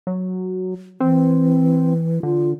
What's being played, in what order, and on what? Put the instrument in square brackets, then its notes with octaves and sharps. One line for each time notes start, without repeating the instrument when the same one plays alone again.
[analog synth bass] F#3
[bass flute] E3 [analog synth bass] C4
[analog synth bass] D3 [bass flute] F4